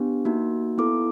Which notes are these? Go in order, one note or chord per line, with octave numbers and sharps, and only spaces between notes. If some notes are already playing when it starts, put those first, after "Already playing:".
Already playing: B3 D4 G4
A#3 D#4 F#4
B3 E4 A4 D6